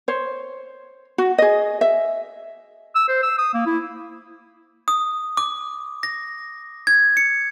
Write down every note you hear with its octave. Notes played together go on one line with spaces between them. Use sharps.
C5 C#5
F#4
G#4 D#5
E5
E6
C5
E6
D#6
A#3
E4
D#6
D6
A#6
G#6
C#7